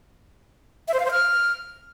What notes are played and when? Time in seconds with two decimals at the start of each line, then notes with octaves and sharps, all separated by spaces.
0.88 E5
0.94 C5
1.00 F5
1.05 C5
1.11 F6